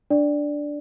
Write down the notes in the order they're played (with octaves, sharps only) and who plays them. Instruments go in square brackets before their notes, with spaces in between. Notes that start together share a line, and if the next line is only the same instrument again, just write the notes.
[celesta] D4 D5